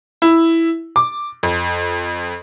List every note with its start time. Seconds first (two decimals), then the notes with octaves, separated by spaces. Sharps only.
0.22 E4
0.96 D6
1.43 F2